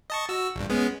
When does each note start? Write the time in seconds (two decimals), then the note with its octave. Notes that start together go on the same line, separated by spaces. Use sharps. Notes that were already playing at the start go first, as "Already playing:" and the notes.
0.10 D#5 A5 C#6
0.29 F#4 E6
0.56 A#1 G2
0.70 G#3 B3 C#4